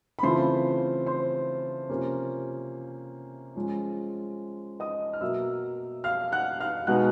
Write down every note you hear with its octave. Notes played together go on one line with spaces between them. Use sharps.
B5
C#3 E3 A3 C4 F4 C5 C6
C5 C6
C3 F3 A#3 C#4
F3 G#3 C#4
D#5 D#6
F6
B2 F#3 A#3 E5 E6
F5 F6
F#5 F#6
F5 F6
B2 G#3 B3 D#4 F#5 F#6